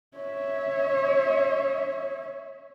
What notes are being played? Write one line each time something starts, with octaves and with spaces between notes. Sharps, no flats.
C#5 E5